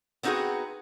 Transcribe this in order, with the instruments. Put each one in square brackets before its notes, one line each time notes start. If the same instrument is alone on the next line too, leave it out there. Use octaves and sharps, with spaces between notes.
[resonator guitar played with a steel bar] B3 C4 D#4 E4 F#4 G#4